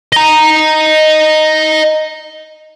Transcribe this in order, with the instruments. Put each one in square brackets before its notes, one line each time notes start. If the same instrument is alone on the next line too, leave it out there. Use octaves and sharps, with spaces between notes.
[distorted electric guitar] D#5 A#5